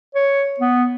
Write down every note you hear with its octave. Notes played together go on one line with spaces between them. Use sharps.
C#5
B3